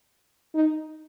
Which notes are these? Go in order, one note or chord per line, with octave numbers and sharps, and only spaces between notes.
D#4